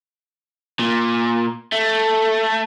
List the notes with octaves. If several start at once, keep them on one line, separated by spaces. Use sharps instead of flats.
A#2
A3